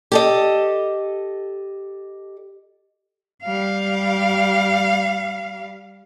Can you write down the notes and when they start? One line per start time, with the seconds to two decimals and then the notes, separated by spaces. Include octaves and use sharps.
0.12 G4 A4 D#5
3.43 G3 F5